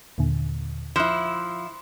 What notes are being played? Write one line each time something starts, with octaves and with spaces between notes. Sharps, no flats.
D#2 A#2 D3
F3 E4 F#6 E7